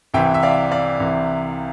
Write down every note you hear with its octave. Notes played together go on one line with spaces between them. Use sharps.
C2 C3 E3 E5 G5
E5
D5 F5
D5 F5
C2 C3 E3